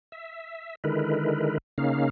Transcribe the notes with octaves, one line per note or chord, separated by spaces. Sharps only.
E5
D3 D#3 G#3 E4 A#4 B4
C#3 A#3 C#4 D#4 F5